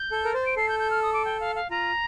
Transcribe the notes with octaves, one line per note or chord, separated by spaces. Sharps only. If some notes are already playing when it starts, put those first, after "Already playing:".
Already playing: G6
A4
A#4
C5 A6
D7
A4 C7
G6
G6
F6
D#6
D6
G5
F5
F5
F4 A#5